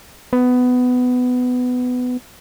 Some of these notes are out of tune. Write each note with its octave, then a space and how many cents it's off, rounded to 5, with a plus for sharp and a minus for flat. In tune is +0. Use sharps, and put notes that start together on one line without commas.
B3 +15